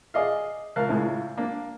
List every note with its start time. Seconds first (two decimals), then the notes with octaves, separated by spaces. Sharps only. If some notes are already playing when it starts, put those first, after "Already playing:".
0.14 G#4 D5 D#5 F5
0.76 C#2 A#4 F5 A5 F#6
0.89 C#2 A2 G#3
1.38 A#3 D4